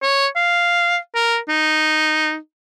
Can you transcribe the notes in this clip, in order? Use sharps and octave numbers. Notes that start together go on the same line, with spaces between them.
C#5
F5
A#4
D#4